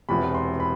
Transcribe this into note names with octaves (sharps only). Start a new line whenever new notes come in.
E1 E2 C3 B5
C6
B5